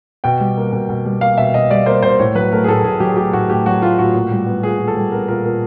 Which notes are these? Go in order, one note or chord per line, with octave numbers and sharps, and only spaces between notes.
B2 G5
G3
A#3
B2
B2
G3
A#3 F5
B2 E5
B2 D#5
G3 D5
A#3 C5
B2 C5
A2 C#5
F#3 B4
A3 A#4
G#4
A2 A4
A2 G#4
F#3 G4
G#4
A3 G4
A2 F#4
A2 G4
F#3 F#4
A3 F4
A2 F#4
A#2
G3
B3
A#2 G#4
A#2
A4
G3
B3 A#4
A#2 A#4
A#2 A#4